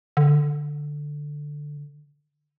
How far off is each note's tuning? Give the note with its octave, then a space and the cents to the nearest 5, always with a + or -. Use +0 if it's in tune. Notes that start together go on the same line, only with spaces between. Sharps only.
D3 +5